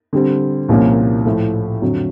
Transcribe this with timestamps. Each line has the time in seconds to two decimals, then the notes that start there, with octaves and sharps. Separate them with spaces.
0.13 D3 G3 C4
0.69 C2 A#2 F3 A#3 C#4
1.26 A2 F3 A3
1.82 F2 D3 F#3